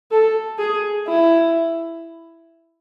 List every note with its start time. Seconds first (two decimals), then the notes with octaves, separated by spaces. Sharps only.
0.11 A4
0.59 G#4
1.08 E4